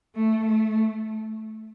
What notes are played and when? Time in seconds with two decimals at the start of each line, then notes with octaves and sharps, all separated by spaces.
0.16 A3
0.46 A3